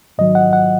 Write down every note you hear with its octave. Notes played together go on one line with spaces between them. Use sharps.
G#2 D#3 F#3 D#5
F#5
F#5